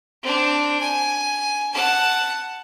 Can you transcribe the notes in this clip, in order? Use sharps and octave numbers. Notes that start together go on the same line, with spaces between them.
C4 D4
G#5
F#5 A5